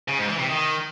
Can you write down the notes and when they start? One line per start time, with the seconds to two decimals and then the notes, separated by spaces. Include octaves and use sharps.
0.08 C#3
0.18 G#2
0.28 E3
0.38 C3
0.49 D#3